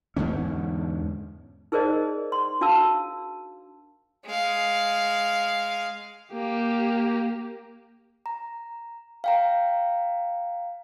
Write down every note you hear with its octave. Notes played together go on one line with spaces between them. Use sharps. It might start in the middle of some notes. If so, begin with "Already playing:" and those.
E2 G#2 D3 C#4
D#4 G#4 A#4 C5 D5 D#5
C6
D4 F#4 F5 A5 E6
G#3 F5
A#3 G4
A#5
F5 G5 A#5